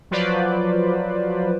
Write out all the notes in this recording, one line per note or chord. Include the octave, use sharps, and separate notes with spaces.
F3 F#3 F4 B4 C5 D5